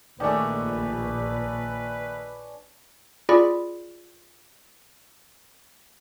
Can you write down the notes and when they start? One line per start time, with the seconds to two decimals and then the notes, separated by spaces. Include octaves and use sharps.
0.20 A#1 D#3 A3 D4 G#4 B4 C#5
3.29 F4 G#4 D5 B5